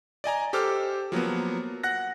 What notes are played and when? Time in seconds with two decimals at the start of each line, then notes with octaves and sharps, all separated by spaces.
0.24 D5 D#5 G#5 A#5
0.53 G4 A4 C5 D6 F6
1.12 F3 F#3 A#3 B3
1.84 F#5 F#6 A#6